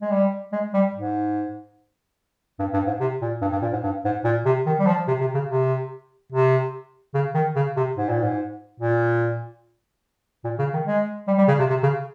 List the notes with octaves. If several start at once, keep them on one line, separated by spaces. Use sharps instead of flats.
G#3
G3
G#3
G3
G#2
G2
G2
G#2
C3
A#2
G2
G2
A#2
G#2
G2
G#2
A#2
C3
D#3
G3
F3
C3
C3
C#3
C3
C3
C#3
D#3
C#3
C3
G#2
A#2
G#2
A#2
A#2
C#3
D#3
G#3
G3
G3
C#3
C3
C3
C#3